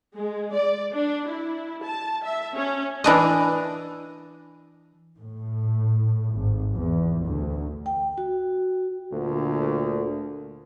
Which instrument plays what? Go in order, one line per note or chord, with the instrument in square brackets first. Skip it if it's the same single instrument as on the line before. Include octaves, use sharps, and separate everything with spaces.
[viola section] G#3
D5
D4
E4
A5
E5
C#4
[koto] E3 D4 D#5
[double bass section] A2
G#1
E2
D2
[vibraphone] G5
F#4
[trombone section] D2 A#2 D3